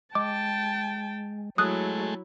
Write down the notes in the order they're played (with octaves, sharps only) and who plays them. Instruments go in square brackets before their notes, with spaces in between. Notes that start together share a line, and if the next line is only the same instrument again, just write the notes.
[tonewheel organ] G#3 [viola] G5 A5 [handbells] D6
[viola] F#3 E4 [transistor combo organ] G#3 A3 [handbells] D#6 F#6